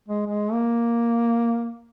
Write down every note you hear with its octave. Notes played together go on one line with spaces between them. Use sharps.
G#3
G#3
A#3